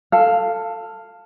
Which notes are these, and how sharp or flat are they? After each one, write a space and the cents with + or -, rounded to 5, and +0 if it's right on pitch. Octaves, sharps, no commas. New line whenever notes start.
A4 +15 F5 +0